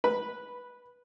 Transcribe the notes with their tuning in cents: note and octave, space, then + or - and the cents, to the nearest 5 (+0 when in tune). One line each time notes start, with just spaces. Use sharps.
B4 -10 B5 +0